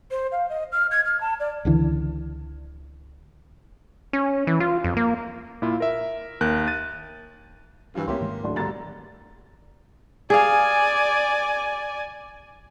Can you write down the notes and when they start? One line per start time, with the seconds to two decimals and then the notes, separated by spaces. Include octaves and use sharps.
0.11 C5
0.32 F5
0.49 D#5
0.72 F6
0.91 G#6
1.05 F6
1.21 A5
1.40 D5
1.65 C#2 D3 E3
4.13 C#4
4.47 E3
4.60 F4
4.84 F2
4.97 A#3
5.62 A#2 E4 F4
5.80 A#4 E5
6.41 D#2 A#4 F#6 G6
6.68 A6 D#7
7.95 G2 E3 F3 F4
8.08 C2 A3 A#3 C4 C#4 G4 E5 C6
8.20 G#2 D#3 G#3
8.43 D1 D4 C6
8.56 G2 B2 D3 A#5 A6
10.30 G#4 D5 F5 G#5